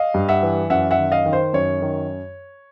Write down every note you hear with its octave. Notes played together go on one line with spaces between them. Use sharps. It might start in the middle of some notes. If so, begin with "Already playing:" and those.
Already playing: D#5 F5
G2
E5 F#5
E3
F#2 E5 F#5
E5 F#5
D#3
D#5 F5
D#3
C5
F#2 C#5
D#3